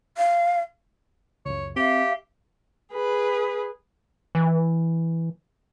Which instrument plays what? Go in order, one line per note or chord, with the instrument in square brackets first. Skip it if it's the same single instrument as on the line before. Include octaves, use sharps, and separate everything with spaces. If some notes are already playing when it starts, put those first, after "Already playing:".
[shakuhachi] F5
[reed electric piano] C#2 F#2 [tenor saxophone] C#5
[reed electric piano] C4 [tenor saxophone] G4 [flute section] E5 F5
[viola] G#4 B4
[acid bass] E3